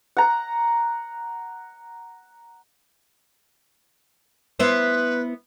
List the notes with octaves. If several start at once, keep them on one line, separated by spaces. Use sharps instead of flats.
F#5 A#5
B3 E4 B4 C5